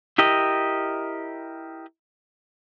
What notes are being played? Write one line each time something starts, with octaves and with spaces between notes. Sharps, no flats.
E4 G4 A#4 D#5